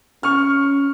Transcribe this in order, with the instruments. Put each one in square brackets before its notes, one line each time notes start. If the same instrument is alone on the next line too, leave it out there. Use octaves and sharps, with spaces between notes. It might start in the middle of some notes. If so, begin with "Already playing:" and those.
[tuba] C#4 [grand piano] C#6 F6